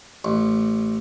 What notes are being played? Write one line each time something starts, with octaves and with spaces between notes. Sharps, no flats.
A1